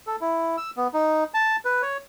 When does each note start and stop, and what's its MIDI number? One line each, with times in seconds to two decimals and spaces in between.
0.07 0.16 69
0.21 0.56 64
0.57 0.71 88
0.77 0.87 59
0.94 1.24 63
1.34 1.56 81
1.65 1.82 71
1.82 1.97 73